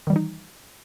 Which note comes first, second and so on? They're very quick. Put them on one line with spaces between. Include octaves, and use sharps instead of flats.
D#3 G3 E3 D#4